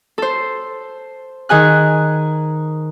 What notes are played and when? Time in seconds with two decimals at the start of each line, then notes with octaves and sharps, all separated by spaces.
0.18 A4 C5
1.49 D#3 G#4 G#5 F#6